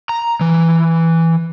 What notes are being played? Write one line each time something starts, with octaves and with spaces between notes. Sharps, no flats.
A#5
E3